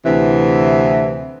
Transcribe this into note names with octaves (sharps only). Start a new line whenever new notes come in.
D2 C3 E3